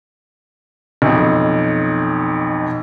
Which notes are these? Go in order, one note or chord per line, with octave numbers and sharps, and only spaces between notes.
B1 F2